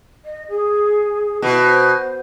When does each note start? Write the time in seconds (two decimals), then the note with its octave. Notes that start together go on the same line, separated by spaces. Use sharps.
0.25 D#5
0.49 G#4
1.42 B2 E4
1.64 C5